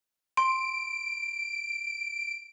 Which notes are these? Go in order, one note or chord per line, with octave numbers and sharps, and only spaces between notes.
C6 D7